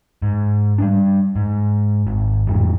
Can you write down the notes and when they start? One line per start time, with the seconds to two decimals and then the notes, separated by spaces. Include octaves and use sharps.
0.22 G#2
0.78 G3 B3 D4
1.36 G#2
2.07 G#1
2.47 A1 F2 G#3